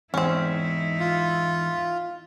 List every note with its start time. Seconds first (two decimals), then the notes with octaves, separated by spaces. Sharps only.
0.14 E2 G#2 C4 C#4 D#4 E4
1.00 F4